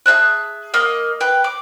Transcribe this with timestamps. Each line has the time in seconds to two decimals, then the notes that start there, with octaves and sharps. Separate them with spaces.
0.06 G#4 E5 A5 F#6
0.74 A#3 D#5
1.21 B4 G5
1.44 D6